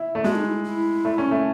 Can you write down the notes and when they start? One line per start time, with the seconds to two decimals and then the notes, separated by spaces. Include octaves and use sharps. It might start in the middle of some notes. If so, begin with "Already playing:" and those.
Already playing: E4
0.15 A3
0.24 G#3 F#4
0.35 D#4
0.45 E4
0.64 E4
1.05 A3
1.18 C#4
1.31 A3